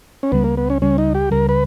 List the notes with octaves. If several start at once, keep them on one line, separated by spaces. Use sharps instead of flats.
C#4
C#2 C#3 G3 B3
A#3
B3
C#4
C#2 C#3 G3 C#4
D#4
G4
C#2 C#3 G3 A#4
B4